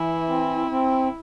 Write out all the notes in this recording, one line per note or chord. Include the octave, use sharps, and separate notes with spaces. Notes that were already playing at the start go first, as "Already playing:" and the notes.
Already playing: E3 E4
C4
C4